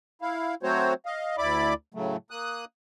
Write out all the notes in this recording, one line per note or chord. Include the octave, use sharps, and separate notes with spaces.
E4 F5
F#3 A3 C4 F#4 C5 C#5
D#5 F5
D2 E4 D5 B5 D6
A2 C#3 F#3 A3
A#3 D#6 F#6